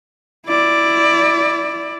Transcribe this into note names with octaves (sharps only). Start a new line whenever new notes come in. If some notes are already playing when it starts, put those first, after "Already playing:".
E4 D5